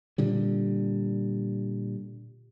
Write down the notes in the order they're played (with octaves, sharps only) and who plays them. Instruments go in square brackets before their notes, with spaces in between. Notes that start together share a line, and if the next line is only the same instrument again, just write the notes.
[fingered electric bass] A#2 D3 G3